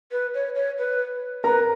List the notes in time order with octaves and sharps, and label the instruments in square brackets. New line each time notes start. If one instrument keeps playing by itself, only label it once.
[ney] B4
C#5
C#5
B4
[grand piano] A#4 A#5 [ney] B4